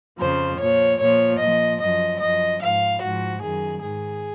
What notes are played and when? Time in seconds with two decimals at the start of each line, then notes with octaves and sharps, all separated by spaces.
0.19 F2 C#3 F3 C5
0.59 A#2 F3 C#5
1.00 A#2 F3 C#5
1.40 A#2 F3 D#5
1.81 F#2 F3 D#5
2.20 F#2 F3 D#5
2.61 G#2 F3 F5
3.01 G#2 F3 F#4
3.41 F#2 D#3 G#4
3.81 G#2 D#3 G#4